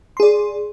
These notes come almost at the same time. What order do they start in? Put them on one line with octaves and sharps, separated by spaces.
C6 G#4 D5